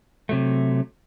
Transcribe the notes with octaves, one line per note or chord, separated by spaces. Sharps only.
C3 F#3 A3